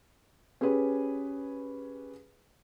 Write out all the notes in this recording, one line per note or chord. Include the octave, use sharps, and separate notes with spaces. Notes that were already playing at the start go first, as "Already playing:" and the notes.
C#4 G4 G#4 B4